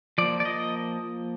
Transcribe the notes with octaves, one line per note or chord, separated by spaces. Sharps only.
F3 A#3 D5
D5
D#5